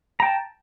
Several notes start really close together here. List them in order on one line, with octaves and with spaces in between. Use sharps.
A#5 G5 A5